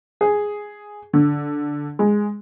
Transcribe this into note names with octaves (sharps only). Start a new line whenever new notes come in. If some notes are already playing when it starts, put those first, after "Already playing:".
G#4
D3
G#3